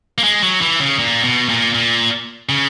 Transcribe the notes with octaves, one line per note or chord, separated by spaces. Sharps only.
A#3
G#3
F#3
E3
C#3
A#2
B2
A#2
A#2
C#3